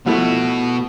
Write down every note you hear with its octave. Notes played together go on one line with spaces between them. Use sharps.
B2 F3 A3 B3 E4 F#4